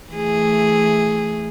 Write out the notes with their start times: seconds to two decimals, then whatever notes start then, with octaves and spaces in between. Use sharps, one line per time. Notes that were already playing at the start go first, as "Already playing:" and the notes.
0.11 E3 A3 G#4